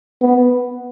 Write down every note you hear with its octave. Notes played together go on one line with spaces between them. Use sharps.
B3